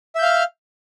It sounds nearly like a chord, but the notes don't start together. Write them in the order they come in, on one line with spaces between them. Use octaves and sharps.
E5 G6 F5 F6